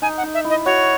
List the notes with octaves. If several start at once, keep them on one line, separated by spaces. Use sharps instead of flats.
D#4 G#5
F#5
D#4
E5
E4
D#5
F#4 C#5